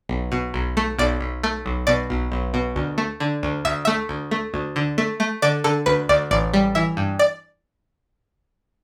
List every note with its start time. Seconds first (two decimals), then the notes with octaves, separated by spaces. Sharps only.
0.09 B1
0.32 B2
0.54 B1
0.77 A3
0.98 B1 D5
1.21 B1
1.43 A3
1.66 B1
1.87 B2 D5
2.10 B1
2.32 B1
2.54 B2
2.76 D2
2.98 A3
3.20 D3
3.43 D2
3.65 D2 E5
3.85 A3 E5
4.09 D2
4.31 A3
4.54 D2
4.76 D3
4.98 A3
5.20 A3
5.42 D3 D5
5.64 D3 A4
5.86 D2 B4
6.09 D2 D5
6.31 A1 D5
6.54 G3
6.75 E3 E5
6.97 G2
7.19 D5